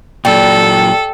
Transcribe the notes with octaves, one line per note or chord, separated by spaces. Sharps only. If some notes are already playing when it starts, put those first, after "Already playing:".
A#2 F#3 G3 A4 G5